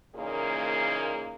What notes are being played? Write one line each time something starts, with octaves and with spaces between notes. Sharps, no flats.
A#2 C#3 E3 A#3 D#4 G#4